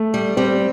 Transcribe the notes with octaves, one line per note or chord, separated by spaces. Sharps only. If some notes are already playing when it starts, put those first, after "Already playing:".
Already playing: A3
G3
G3 C4